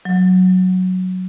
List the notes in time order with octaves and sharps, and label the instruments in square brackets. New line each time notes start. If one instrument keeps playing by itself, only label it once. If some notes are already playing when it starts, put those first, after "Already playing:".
[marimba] F#3